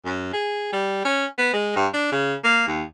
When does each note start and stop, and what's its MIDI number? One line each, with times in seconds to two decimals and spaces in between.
0.05 0.32 42
0.33 0.72 68
0.73 1.00 55
1.05 1.25 61
1.38 1.50 59
1.53 1.72 56
1.76 1.87 43
1.93 2.11 62
2.12 2.35 49
2.44 2.63 58
2.67 2.83 39